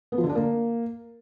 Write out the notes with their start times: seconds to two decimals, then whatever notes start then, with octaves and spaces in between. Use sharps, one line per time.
0.12 B3
0.18 F3
0.24 D3
0.29 D4
0.35 A#3